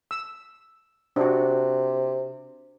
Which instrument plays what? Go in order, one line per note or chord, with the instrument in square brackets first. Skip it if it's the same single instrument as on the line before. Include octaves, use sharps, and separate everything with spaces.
[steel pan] E6
[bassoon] C3 [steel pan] D4 F#4